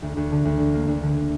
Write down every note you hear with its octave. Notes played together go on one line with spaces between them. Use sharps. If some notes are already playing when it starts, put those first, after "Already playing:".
D2
D2
D3
D2
D3
A#3
D2
D3